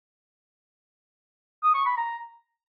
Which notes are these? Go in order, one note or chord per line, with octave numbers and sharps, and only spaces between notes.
D#6
C#6
B5
A#5